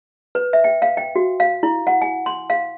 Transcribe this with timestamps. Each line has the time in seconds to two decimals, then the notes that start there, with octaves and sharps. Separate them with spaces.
0.35 B4
0.53 E5
0.64 G5
0.82 F5
0.97 G5
1.16 F#4
1.40 F5
1.63 E4
1.87 F#5
2.02 G#5
2.26 C6
2.50 F5